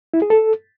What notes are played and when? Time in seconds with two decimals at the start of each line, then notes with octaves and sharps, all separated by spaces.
0.14 E4
0.22 G#4
0.30 A4